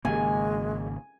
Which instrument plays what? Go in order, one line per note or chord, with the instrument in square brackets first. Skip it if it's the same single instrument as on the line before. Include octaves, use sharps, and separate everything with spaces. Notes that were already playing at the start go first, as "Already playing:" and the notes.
[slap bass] G#1 C#3 A#3 [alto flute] G#3 [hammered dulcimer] G#5